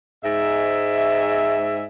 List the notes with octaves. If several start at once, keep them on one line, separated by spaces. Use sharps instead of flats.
G#2 E5